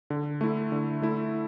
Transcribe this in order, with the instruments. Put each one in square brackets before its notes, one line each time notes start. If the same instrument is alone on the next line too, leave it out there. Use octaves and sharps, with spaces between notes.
[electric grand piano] D3
A3 E4
D3
A3 E4